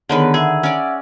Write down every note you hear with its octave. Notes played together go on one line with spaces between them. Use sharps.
D3 D#3 B3 G#4 B4 C#5
G#4 E5 F#5 E6
C#4 D5